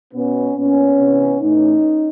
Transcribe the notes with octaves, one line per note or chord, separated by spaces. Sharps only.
B2 B3 C#4
A#2 B3 C#4
C3 E3
A2 E3 C#4 D#4